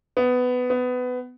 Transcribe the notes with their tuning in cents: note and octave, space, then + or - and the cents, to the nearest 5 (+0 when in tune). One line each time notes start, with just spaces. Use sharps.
B3 +15
B3 +20